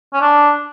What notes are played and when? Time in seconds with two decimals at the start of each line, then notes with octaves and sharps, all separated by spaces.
0.13 C#4
0.21 D4